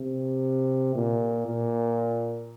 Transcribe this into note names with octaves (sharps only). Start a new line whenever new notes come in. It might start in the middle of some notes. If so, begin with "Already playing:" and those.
Already playing: C3
A#2
A#2